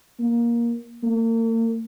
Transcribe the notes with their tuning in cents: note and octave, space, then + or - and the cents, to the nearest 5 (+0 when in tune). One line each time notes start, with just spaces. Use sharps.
A#3 +15
A#3 -40